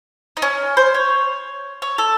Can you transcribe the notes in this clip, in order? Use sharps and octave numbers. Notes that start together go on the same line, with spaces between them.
D#4
C#4
C5
C#5
C#5
A4